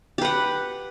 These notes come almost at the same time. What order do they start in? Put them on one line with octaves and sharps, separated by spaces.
G4 B4 F#5